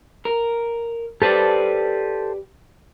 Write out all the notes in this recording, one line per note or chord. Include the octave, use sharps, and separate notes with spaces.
A#4
G4 A4 B4 C5 D5 A5